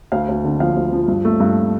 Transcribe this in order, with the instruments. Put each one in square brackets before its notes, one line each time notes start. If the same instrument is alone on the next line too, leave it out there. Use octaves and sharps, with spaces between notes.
[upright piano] D2 F5
D2
D3
F3 F5
D2
F3
G2
A3
G2